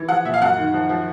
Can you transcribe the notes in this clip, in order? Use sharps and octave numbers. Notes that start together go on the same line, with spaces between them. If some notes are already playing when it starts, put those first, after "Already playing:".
Already playing: E3
F3 F#5
A#2 E5
F5
F#2 F#5
D#3
F3
F3